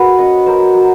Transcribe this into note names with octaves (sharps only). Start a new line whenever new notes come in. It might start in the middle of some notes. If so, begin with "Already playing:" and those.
Already playing: A#3 F#4 G#4 B4
C#4 C#5 D#5
F#3 A#4 C5
F#3